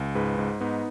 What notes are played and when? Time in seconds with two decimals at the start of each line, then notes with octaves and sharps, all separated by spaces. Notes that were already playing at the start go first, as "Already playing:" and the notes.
Already playing: C#2
0.15 G#2 G#4 B4
0.38 G#2
0.61 G#2 B3 D#4